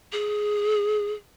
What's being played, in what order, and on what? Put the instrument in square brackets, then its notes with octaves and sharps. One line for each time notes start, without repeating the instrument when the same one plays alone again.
[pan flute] G#4